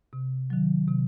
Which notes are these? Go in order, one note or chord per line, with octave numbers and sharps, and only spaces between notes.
C3
D#3 F#3
C3